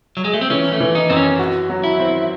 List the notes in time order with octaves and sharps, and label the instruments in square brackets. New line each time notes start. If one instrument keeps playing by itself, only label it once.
[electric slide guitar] F#3
G#3
A3
C4
[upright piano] E3 [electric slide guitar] C#4
[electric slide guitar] A3
[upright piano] E3
[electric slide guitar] D#4
[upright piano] F#2 [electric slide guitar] C4
[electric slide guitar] C#4
[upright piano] F#4
F#3
[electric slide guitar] E4
[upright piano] C4